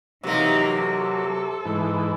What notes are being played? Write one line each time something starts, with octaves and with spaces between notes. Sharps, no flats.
C3 E3 F#3 A#3 D#4
A4
G#2 E3